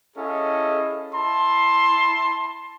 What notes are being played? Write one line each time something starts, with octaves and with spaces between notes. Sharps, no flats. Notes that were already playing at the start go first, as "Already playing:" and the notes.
C#4 E4 G#4 A4 D#5 F5
E4 A5 B5 C6